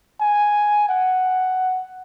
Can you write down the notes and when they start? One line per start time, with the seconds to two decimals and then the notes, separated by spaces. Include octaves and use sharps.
0.20 G#5
0.89 F#5